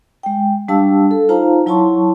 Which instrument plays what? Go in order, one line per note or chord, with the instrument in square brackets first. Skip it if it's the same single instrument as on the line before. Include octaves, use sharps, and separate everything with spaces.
[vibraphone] G#3 G5
G3 D4 G4 F5 A5 E6
A4
D#4 F4 C5 F5 A5 A#5
F#3 E4 C#5 A5 C6 C#6